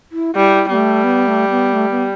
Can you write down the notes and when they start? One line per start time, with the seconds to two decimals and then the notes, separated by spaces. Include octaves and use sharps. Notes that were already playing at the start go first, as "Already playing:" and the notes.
0.12 E4
0.35 G3 E4
0.70 G3 B3
0.74 A3
1.04 B3
1.27 A3
1.50 B3
1.73 A3
1.91 B3